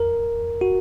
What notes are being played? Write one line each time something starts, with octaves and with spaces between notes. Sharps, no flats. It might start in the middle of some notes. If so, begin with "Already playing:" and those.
Already playing: A#4
F#4